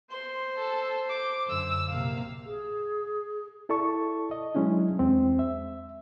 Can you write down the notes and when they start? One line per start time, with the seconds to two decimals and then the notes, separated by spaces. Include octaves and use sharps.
0.11 C5 C6
0.59 A4
1.09 D6
1.49 F#2 D3 E6
1.88 A#1 C3 A#3 F5
2.46 G#4
3.69 E4 A4 D5 A5 C#6
4.31 D#5
4.55 F#3 G#3 C#4 D4 E4
4.99 E2 G#3 C4
5.39 E5